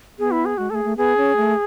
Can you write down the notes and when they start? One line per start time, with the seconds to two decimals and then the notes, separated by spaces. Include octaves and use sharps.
0.19 B3 G#4
0.31 E4
0.45 G#4
0.57 G#3 F#4
0.70 A3 G#4 A4
0.84 A3
0.97 B3 G#4
1.17 C#4
1.36 A3